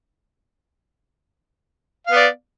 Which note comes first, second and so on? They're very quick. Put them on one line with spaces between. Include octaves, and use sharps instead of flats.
F5 B3 D5